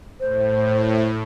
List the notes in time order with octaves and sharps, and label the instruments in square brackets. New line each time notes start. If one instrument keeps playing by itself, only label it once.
[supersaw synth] A2 [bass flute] C5